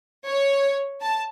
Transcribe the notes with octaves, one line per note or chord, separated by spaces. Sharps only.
C#5
A5